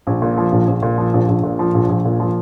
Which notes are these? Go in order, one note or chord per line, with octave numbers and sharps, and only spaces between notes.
A#1
A#2
F3
A#1
A#1
A#2
F3
A#1
A#1
A#2
F3
A#1
A#1
A#2
F3